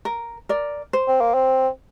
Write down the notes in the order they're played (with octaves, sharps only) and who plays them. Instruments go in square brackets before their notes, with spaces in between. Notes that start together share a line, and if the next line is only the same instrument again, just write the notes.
[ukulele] A#4
A#4 D5
C5
[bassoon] C4
A#3
C4